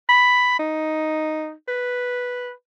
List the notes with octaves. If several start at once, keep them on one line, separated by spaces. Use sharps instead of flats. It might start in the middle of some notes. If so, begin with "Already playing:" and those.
B5
D#4
B4